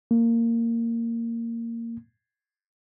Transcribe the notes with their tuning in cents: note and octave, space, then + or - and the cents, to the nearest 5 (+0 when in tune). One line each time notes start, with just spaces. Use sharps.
A#3 -15